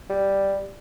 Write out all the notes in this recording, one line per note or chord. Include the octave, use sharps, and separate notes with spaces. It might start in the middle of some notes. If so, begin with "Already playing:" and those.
G3